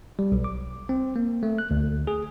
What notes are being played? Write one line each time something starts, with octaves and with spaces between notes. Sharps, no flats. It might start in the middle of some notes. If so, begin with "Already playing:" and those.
G3
B1
D6
C4
A#3
A3
F#6
D2
G#4